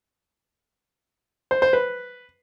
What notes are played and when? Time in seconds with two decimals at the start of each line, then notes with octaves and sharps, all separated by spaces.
1.51 C5
1.62 C5
1.73 B4